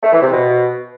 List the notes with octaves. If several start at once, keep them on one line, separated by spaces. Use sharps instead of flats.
A3
E3
C3
B2